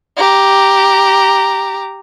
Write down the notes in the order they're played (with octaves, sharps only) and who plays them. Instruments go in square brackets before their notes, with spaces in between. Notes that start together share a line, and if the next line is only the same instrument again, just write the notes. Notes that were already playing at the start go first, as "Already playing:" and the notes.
[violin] G4 A#5